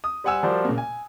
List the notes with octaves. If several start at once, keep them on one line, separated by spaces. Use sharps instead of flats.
D#6
G3 C5 F#5 G#5 E6 E7
F3 G3 F#4 A#4 C5 D5
A#2 C#3 A#3
G#5